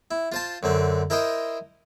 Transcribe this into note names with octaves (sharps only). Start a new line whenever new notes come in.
E4
F4 C5 A5
F#2 D3 C4
E4 A#4 C5 D#5 G5 C6